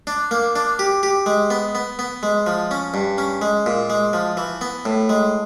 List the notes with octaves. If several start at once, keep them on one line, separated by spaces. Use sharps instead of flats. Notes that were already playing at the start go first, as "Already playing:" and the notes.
D4
A#3
D4
G4
G4
G#3
B3
B3
B3
G#3
F3
C#4
G2
C#4
G#3
A#2
G#3
F3
E3
B3
A2
G#3